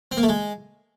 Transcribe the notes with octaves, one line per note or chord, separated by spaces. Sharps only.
C4
A#3
A3
G#3